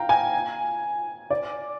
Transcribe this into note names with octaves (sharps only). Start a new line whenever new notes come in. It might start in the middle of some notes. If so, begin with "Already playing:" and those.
Already playing: F5 G5 A#5
G#5
D5